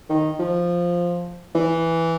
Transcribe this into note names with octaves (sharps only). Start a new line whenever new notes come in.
D#3
F3
E3